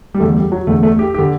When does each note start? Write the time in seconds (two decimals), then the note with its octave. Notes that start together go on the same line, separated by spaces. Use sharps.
0.14 G3
0.20 E2 D3 A3
0.36 G3
0.52 F#3
0.67 E2 D3 A3
0.83 A3
0.99 G4
1.14 G4
1.19 D3